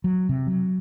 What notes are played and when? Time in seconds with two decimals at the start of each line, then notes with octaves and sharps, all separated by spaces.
0.04 F#3
0.29 C3
0.47 F#3